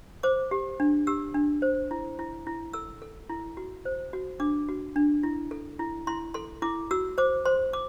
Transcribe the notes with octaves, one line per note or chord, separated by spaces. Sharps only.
C5 D6
G4
D4
G4 E6
D4
C5
E4
E4
E4
A4 E6
A4
E4
F#4
C5
F#4
D4 D6
F#4
D4
E4
A4
E4
E4 C6
A4 C6
E4 D6
F#4 E6
C5 D6
C5 C6
D6